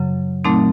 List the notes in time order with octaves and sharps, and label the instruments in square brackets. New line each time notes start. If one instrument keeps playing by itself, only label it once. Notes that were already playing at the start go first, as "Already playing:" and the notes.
Already playing: [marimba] F#2 C#3 F#3
A#2 F#3 A3 C4 D#4